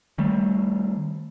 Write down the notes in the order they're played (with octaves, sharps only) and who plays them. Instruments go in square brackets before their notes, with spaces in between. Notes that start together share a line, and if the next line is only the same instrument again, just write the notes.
[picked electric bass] D#3 G3 A3